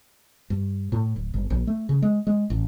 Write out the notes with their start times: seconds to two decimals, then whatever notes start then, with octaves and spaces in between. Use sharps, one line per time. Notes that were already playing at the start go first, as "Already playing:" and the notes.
0.50 G2
0.92 A2
1.16 D1
1.34 G1
1.50 A#1
1.67 A3
1.89 C#3
2.02 G#3
2.27 G#3
2.50 A1